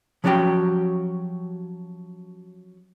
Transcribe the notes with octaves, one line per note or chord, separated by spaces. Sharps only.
F3 F#3 C#4 F#4 G4 G5